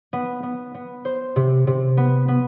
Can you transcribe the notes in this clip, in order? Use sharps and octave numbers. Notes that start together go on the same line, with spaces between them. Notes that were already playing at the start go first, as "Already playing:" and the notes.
B3
B3
B3
C5
C3
C3
B3
B3